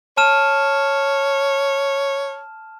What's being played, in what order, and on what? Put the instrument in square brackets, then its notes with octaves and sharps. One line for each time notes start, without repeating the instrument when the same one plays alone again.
[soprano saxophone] C#5 [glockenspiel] A5 F6 E7